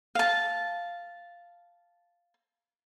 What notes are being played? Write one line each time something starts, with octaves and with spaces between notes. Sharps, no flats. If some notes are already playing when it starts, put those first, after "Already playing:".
F5 A5